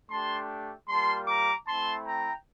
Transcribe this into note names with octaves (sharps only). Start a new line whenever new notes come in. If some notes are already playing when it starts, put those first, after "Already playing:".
A3 D4 G4 A5 C6
G3 A#3 F4 A5 C6
A#5 D6
A3 C4 E4 A5 C6
G5 A#5